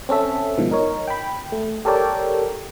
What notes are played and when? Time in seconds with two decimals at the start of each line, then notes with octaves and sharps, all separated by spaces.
0.09 C4 C#4 A4 E5
0.58 G#2 B2 D#3 F3
0.71 D#4 A#4 C#5
1.07 G5 B5
1.52 A3
1.85 G4 A4 A#4 C#5 D5 G5